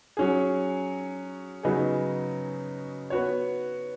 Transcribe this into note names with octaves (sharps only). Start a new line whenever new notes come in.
F#3 C#4 G#4
C#3 F#3 B3 D#4 G#4
B3 F#4 C#5